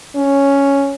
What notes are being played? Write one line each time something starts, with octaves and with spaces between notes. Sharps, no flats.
C#4